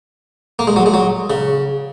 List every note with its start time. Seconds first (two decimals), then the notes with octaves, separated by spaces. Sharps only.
0.59 A#3
0.67 G#3
0.76 F#3
0.86 G#3
0.94 F#3
1.30 C#3